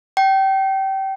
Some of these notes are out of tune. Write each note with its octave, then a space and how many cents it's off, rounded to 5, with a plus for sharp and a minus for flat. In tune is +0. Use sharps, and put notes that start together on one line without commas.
G5 -25